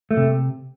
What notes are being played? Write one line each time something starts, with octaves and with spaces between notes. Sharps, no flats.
A3
C3